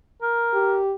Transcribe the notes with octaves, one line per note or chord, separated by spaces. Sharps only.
A#4
G4